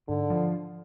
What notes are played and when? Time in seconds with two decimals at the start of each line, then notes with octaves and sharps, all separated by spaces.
0.08 G#2 D3
0.30 F3